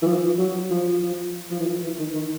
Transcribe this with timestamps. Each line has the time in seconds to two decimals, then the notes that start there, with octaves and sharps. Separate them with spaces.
0.02 E3
0.06 F3
0.38 F#3
0.71 F3
1.03 F3
1.51 F3
1.60 E3
1.67 F3
1.83 E3
1.99 D#3
2.15 D#3